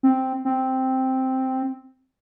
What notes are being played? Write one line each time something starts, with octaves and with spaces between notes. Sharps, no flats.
C4
C4